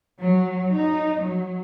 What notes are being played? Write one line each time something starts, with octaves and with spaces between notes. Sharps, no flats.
F#3
D#4
F#3